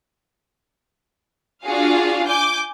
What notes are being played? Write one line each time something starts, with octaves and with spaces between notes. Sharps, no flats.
D4 F4 F#4 G#4 F5
G#5 D6 G6